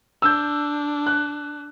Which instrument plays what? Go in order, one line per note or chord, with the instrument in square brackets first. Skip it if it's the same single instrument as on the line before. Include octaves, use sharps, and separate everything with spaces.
[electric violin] D4 [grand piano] E6 G6
[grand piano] F#6